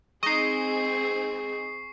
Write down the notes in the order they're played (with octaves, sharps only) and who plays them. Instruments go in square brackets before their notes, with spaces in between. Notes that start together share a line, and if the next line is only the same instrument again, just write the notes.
[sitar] G#3 [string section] C4 G#4 [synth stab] D#4 D#5 [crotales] C#6 C7